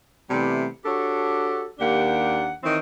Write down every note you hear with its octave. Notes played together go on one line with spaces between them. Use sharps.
C3 E3 G3 A3 B3
D4 F#4 G4 A4 C#5
D#2 A#3 D4 G4 F#5
D#3 E3 C4 C#5 D#5